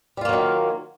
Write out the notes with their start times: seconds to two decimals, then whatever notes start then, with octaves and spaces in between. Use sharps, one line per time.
0.17 G3
0.21 F4
0.25 A#3
0.29 F#3
0.33 D#3